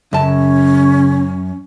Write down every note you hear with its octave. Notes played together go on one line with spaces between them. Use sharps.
F#2 C#3 C#4 A5